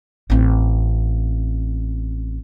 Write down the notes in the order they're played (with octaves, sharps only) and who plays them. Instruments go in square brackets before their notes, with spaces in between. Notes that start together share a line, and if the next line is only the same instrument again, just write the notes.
[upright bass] A1 C4